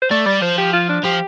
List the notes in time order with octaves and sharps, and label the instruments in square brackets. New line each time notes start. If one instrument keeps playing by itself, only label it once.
[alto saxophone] C5
[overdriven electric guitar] A3 [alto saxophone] D5
[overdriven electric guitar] G3 [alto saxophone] D5
[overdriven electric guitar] F3 [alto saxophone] C5
[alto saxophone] G4
F4
D4
[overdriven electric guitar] F3 [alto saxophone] G4